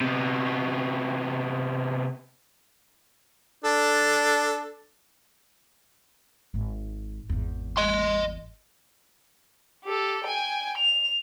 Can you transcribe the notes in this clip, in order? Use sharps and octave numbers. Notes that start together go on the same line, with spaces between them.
C3 B3
D4 A4
G#1 G#3
G#1 E2
D#5 C6
G4 A4
G5 G#5
F7